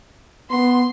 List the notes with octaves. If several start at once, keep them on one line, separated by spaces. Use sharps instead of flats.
B3 C6